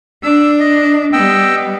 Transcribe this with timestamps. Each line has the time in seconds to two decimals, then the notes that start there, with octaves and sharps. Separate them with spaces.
0.23 D4 E6
0.60 D#5
1.13 G3 B3 D#5 G5 E6